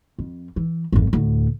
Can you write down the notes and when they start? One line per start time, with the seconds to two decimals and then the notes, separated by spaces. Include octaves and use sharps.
0.19 F2
0.56 E3
0.92 G#1 F2
1.13 D2 A2